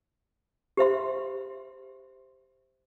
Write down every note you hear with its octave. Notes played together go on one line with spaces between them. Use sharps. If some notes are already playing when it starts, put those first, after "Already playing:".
G4 C5 E5 C6